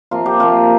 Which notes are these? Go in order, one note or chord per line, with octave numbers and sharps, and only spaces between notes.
C3 F3 A#3 F4
G4
C3 F3 A#3 F4